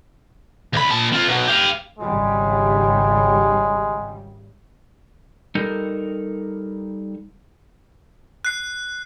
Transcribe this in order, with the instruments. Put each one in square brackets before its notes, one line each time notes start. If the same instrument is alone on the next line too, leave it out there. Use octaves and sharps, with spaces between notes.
[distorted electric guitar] D2 B5
A#2 A5
C4 F4
B2 F#3
G4 F5
[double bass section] G#1 C#3 G3 [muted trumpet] G#3
[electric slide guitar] G3 D#4 A4 A#4
[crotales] F#6 C7